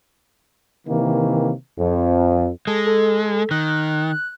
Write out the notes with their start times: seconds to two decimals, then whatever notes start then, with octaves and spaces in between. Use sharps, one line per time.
0.86 C3 D#3 E3 A#3
1.79 F2
2.67 G#3 A4
2.86 A4
3.51 D#3 F#6